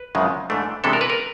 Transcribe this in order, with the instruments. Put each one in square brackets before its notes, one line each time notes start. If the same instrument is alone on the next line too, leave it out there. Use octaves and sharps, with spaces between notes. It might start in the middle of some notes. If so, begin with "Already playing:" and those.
Already playing: [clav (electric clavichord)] B4
F#2 C#3 F3 G#3
G#2 E3 A3 D4
C3 E3 G#3 B3 D4 A4
A#4
B4
A#4